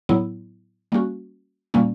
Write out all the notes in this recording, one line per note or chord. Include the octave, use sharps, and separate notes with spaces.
A2 F#3 B3 E4
G3 A#3 C#4 F#4
A#2 G3 A#3 C#4